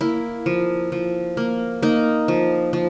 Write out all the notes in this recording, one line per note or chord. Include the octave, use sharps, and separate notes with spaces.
A#3 E4
F3
F3
A#3
A#3 D#4
F3
F3